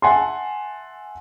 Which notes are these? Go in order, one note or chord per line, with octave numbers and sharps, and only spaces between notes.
E5 F#5 G#5 A5 C6